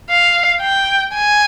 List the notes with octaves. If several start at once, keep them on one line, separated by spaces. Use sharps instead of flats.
F5
G5
G#5